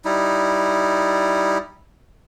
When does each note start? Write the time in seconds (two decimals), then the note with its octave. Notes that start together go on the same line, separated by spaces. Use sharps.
0.05 G3 D#4 E4